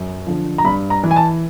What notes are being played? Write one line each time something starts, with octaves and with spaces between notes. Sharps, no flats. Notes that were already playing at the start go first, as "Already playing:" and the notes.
Already playing: F#2
D3 F3
A#5
G2 B5
A#5
E3
G#5
A5